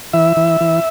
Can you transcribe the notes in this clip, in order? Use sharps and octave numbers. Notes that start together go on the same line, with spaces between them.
E3 E5
E3
E3